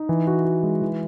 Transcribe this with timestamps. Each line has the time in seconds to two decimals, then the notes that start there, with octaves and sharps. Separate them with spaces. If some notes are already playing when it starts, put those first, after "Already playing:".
Already playing: D#4
0.09 E3
0.27 F#4
0.45 F#4
0.63 G#3
0.82 E3